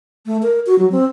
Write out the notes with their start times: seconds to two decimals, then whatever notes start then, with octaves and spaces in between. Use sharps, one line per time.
0.26 A3
0.43 A#4
0.66 F#4
0.79 F#3
0.92 C4